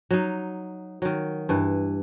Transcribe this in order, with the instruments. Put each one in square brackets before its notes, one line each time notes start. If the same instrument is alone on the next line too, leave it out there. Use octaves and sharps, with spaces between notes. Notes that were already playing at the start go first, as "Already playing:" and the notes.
[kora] F#3 D#4
D#3 F#3
G2 E3